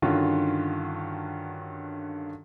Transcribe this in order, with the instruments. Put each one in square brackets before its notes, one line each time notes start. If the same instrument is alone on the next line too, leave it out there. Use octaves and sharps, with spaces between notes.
[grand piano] G2 D3 D#3 C#4 F4 F#4